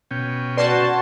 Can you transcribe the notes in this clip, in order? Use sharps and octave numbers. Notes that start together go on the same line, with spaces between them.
B2 C#4 G5
F#4 B4 D5 A5 C6